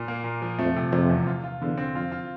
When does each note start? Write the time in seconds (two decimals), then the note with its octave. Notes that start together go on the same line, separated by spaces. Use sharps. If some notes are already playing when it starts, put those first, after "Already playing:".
Already playing: A#2
0.08 A#3
0.24 A#2
0.42 F3
0.59 F2 A3
0.76 C3
0.92 F2 C3
1.10 E2
1.27 F4
1.44 F4
1.61 E2 D3
1.78 C4
1.95 F2 F4
2.12 F4